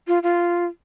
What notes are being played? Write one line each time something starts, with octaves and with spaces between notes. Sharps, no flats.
F4
F4